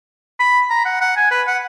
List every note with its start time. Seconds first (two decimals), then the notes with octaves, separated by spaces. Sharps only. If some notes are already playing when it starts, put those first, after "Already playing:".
0.39 B5
0.70 A#5
0.85 F#5
1.01 F#5
1.16 G#5
1.31 B4
1.47 F#5